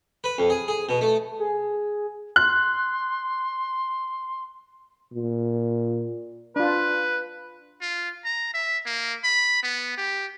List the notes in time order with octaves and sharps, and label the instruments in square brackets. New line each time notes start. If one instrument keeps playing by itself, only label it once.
[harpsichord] B4
F2
G#4
G#4
B2
A3
[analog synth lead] G#4
[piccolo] C6 [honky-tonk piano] F#6
[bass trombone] A#2
[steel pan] D4 F4 [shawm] B4
[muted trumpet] F4
A#5
E5
A#3
B5
B3
G4